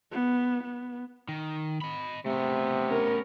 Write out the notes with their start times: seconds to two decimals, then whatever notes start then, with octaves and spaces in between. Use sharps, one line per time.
0.12 B3
0.63 B3
1.28 D#3
1.82 D#5 B5
2.26 C3 A3 B3
2.86 C#4 A#4